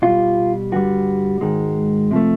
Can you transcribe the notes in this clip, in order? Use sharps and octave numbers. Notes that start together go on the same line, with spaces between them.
B2 G3 F4
G2 D3 G3 F#4
G#2 D#3 G#3
C3 F3 A3